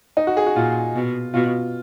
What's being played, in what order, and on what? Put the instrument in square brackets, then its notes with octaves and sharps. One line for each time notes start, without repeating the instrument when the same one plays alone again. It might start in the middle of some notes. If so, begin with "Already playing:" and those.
[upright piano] D#4
F#4
G#4
F#4
[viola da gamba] A#2 [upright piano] F4
[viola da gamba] B2
[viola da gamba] B2 [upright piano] F4